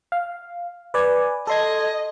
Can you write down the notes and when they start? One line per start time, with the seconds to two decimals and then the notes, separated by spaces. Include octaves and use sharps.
0.12 F5
0.94 B4 D5 G#5
1.47 A4 D#5 C6 G#6